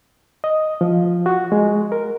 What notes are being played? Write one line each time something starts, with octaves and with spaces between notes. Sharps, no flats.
D#5
F3
F#4
G#3
A#4